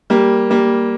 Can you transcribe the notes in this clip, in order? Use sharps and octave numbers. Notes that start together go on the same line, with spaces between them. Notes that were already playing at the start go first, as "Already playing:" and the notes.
G3 A#3
G3 A#3